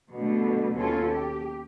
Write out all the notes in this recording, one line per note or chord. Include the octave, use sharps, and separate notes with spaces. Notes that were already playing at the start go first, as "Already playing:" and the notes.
B2 D3 G3 A3
D#2 B2 C#4 F4 A4
G4